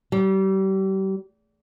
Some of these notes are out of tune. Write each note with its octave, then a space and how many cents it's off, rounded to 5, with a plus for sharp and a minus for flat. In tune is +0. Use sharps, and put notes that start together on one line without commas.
G3 -35